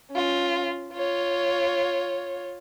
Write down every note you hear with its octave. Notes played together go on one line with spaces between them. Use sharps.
C#4 F4
F4 C#5